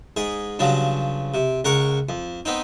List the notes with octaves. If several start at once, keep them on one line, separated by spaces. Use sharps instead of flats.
G#2 G#4
G2 C#3 F3 F#3
C3
C#2 A#4 F#5 C#6
F2
B3 C4 D#4